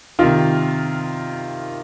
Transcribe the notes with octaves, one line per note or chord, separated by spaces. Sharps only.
C3 D#3 F4